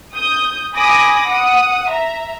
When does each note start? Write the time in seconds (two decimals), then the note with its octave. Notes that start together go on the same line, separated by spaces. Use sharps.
0.14 D#6 G6
0.75 G#5 B5 D6 D#6 A#6
1.28 F#5 D#6
1.88 E5 A#5